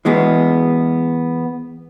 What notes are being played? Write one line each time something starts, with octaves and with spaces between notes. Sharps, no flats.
E3 G#3 B3